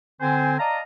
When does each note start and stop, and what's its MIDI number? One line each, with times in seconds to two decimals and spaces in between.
0.21 0.56 50
0.21 0.56 60
0.21 0.56 72
0.21 0.56 80
0.58 0.80 74
0.58 0.80 75
0.58 0.80 77
0.58 0.80 81
0.58 0.80 82